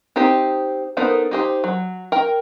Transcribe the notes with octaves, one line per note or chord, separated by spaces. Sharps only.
C4 D#4 G4 C5
B3 D#4 A4 A#4 C5
D#4 G4 C5
F#3
A#4 G5